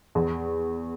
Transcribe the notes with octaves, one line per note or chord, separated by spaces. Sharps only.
E2